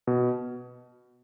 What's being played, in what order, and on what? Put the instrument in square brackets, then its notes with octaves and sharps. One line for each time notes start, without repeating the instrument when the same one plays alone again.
[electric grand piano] B2